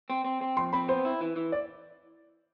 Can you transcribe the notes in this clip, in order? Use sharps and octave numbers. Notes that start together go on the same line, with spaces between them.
C4
C4
C4
F2 C6
C4 B5
B3 C5
E4
E3
E3
D5